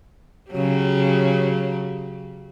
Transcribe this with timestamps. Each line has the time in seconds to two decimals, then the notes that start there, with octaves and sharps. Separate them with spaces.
0.51 C#3 F#3 G4